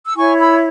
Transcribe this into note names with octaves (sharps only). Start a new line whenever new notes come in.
E6
E4 C#5 G#5 C#6
B5 E6